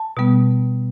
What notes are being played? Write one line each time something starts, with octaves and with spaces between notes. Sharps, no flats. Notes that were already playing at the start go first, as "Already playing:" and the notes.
Already playing: A5
B2 G3 B3